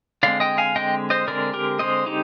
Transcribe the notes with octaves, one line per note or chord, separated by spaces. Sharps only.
D3 G#3 C4 D5 F5
D#5 G5
F5 G#5
D3 G#3 C4 D#5 G5
C5 D#5
D3 G#3 C4 A#4 D5
G4 A#4
D3 G#3 C4 C5 D#5
D#4 G4